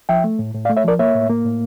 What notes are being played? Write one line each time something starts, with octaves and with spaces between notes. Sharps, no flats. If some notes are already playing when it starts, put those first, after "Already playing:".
F3 E5 G5
A3
A2
A2
D5 F5
A3
C#5 E5
F3 A#4 D5
A#3 C#5 E5
A2
A#3
A2